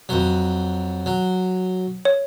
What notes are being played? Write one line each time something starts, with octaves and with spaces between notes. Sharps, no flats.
F2 F#3
F#3
C#5